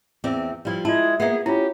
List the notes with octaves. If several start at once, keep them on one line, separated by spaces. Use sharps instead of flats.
E2 C4 D5
F3 G3 E4
G#3 E4 F4 A5
A#3 B3 G#4 E5 F#5
C#4 E4 F4 G4